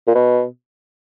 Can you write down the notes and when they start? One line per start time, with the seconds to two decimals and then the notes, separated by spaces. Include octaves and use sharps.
0.07 A#2
0.15 B2